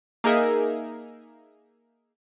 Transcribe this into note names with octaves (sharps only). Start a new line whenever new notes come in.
A#3 D#4 G#4 A#4 E5